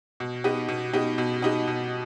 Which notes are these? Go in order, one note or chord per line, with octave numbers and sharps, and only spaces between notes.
B2
B3 D#4 G4
B2
B3 D#4 G4
B2
B3 D#4 G4
B2